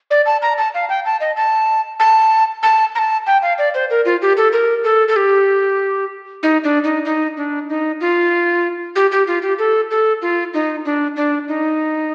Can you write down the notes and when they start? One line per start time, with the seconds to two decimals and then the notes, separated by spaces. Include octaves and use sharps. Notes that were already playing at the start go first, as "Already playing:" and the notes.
0.11 D5
0.26 A5
0.42 A#5
0.58 A5
0.74 F5
0.89 G5
1.06 A5
1.21 D#5
1.36 A5
2.00 A5
2.63 A5
2.95 A#5
2.99 A5
3.27 G5
3.42 F5
3.58 D5
3.74 C5
3.90 A#4
4.05 F4
4.22 G4
4.37 A4
4.53 A#4
4.84 A4
5.08 A4
5.16 G4
6.43 D#4
6.64 D4
6.84 D#4
7.05 D#4
7.37 D4
7.69 D#4
8.01 F4
8.96 G4
9.12 G4
9.27 F4
9.42 G4
9.59 A4
9.91 A4
10.22 F4
10.54 D#4
10.85 D4
11.16 D4
11.48 D#4